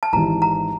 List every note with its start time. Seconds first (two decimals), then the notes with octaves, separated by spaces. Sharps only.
0.03 A5
0.13 G#1 G#2 E3 G3 A#5
0.42 A#5